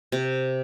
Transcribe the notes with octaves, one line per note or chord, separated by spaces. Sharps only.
C3